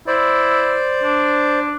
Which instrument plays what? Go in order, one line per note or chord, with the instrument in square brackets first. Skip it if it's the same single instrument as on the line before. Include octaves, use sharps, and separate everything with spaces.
[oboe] E4 [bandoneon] C5 D5
[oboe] D4